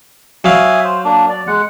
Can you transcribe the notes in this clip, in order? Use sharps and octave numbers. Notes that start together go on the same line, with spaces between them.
F#3 E5 F5 G#5 D#6
C5
A#3 D4
D5
G#3 F#5